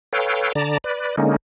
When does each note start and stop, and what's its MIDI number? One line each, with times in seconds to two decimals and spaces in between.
0.13 0.53 69
0.13 0.53 71
0.13 0.53 73
0.13 0.53 77
0.13 0.53 79
0.55 0.78 50
0.55 0.78 74
0.55 0.78 81
0.55 0.78 82
0.84 1.16 71
0.84 1.16 74
1.18 1.36 50
1.18 1.36 56
1.18 1.36 58
1.18 1.36 61
1.18 1.36 63